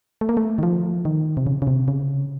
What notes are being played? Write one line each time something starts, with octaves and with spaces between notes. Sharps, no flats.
A3
A#3
A3
D#3
F3
D#3
C3
C#3
C#3
C3
C#3